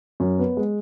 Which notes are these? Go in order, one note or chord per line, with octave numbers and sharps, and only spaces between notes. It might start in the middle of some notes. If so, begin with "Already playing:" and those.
F#2
B3
G#3